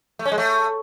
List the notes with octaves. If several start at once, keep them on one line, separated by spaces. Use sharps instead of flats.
A3
C#4
G#3
A3